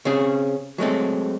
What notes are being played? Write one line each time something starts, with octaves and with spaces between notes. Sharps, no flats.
C#3 C4 C#4 G#4
F#3 G#3 A3 C4